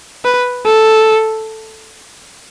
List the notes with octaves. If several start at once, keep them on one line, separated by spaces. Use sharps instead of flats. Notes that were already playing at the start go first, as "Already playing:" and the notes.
B4
A4